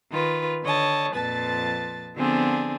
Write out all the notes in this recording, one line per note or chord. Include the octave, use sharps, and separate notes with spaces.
D#3 F4 B4
D3 C#5 D#5 A5
F2 A#2 F3 B4 A5 A6
D3 F3 B3 C4 D4 G#4